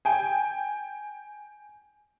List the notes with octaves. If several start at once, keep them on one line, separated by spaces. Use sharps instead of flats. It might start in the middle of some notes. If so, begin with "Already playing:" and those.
G5 G#5